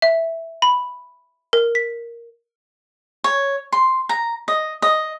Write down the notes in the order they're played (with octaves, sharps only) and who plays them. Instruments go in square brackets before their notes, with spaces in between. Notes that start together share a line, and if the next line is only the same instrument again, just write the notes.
[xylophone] E5
B5
A#4
B6
[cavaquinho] C#5
C6
A#5
D#5
D#5